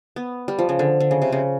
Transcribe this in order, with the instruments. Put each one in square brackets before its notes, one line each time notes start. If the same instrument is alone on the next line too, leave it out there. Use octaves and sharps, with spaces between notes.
[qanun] B3
G3
F3
C#3
D3
D3
C#3
C3
C#3